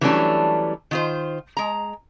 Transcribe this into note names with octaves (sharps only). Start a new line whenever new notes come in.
E3 F#3 G3 A3 C#4 D4
D#3 F4 C5
G#3 A#5